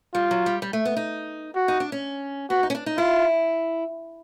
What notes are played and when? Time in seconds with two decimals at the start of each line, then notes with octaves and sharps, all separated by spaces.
0.14 G3 F4
0.31 F#3
0.46 G3
0.62 G3
0.73 A3
0.85 B3
0.97 D#4
1.56 F#4
1.68 D#4
1.80 D4
1.92 C#4
2.50 B3 F#4
2.63 D#4
2.70 C#4
2.75 D4
2.86 D#4
2.98 E4 F4